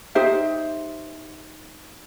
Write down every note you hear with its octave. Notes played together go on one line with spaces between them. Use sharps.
D#4 G4 C5 E5